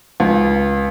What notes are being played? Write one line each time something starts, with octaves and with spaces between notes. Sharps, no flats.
C#2